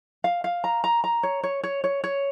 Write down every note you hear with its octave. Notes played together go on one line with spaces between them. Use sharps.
F5
F5
A#5
A#5
A#5
C#5
C#5
C#5
C#5
C#5